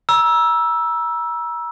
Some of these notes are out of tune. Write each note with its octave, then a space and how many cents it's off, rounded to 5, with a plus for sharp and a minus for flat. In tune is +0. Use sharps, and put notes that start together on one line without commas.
A#5 +40 E6 +0